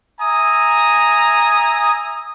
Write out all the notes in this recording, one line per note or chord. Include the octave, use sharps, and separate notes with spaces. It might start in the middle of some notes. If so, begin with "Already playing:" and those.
E5 G#5 A#5 D#6